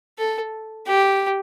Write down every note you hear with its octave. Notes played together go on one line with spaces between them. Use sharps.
A4
G4